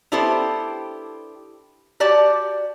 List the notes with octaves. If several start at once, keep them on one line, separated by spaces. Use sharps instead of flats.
B3 D4 E4 G4 A4 C5
F#4 G4 D5 A5